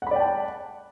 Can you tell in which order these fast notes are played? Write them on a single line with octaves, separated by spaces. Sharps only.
F#5 B5 D5 G5 A5